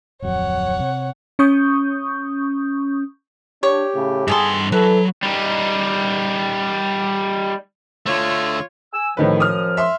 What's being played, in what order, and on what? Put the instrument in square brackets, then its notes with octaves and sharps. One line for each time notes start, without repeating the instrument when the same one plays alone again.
[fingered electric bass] D1 F2 F#3 [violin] C#5 F#5
[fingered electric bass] C3
[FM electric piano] C#4 C#6 D#6 G6
[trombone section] D4 [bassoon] G4 [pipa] C#5
[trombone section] A2 C#3
[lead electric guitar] G2 C6 [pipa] D#3 B3 A4 [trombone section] G#4
[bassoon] E3 [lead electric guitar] F#3 [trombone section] A4 [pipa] B4
[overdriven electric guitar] G3 D#4
[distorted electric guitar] D3 A3 [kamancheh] F4 C#5
[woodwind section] G#5 E6
[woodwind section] F#2 F3 [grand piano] A2 D#3 B4
[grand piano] D#6 F6
E5 C6